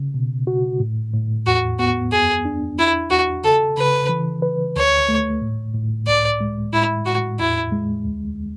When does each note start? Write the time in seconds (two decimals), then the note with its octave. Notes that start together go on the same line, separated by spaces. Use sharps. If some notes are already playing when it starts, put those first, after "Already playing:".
Already playing: C#3
0.14 B2
0.47 F#4
0.80 A2
1.13 A2
1.47 E2 F#4
1.79 B3 F#4
2.12 F#2 G#4
2.45 D4
2.78 E2 E4
3.10 E2 F#4
3.44 C#3 A4
3.77 C#3 B4
4.09 E3
4.42 B4
4.76 D2 C#5
5.09 A3
5.42 A2
5.74 A2
6.07 C#2 D5
6.41 G#3
6.73 A2 E4
7.06 A2 F#4
7.39 E2 E4
7.72 G#3
8.05 D2